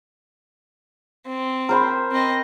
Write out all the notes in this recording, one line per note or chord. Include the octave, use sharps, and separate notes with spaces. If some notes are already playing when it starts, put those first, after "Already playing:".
C4
A#4 C5 B5
C4 D#5